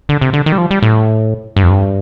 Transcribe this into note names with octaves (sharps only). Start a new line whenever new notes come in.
D3
C3
D3
D#3
G3
F3
G3
A2
G2
F2
G2